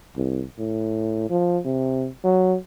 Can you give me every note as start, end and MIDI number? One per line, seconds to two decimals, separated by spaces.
0.16 0.43 36
0.59 1.29 45
1.30 1.58 53
1.65 2.07 48
2.24 2.56 54